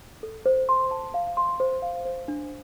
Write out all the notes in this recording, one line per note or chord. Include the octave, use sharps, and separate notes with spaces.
A4
C5
C6
A5
F5
C6
C5
F5
C5
D4